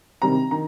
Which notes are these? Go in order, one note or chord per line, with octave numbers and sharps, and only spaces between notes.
C3 D#3 G3 C4 A#5
D#3 A#5